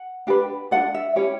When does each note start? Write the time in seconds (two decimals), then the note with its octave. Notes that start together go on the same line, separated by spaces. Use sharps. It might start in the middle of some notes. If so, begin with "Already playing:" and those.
Already playing: F#5
0.27 D4 G4 B4
0.71 D4 F#4 A4 F#5
0.94 E5
1.16 C#4 E4 G4 C#5